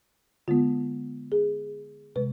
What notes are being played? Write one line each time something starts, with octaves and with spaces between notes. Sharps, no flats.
D3 G#3 B3 F4
G#4
C3 G#3 B4